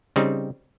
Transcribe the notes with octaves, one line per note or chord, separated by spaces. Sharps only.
C#3 G3 C4 D#4